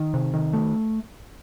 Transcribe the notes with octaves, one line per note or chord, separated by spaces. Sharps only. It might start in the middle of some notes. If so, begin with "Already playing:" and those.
Already playing: D#3
C3
D#3
A3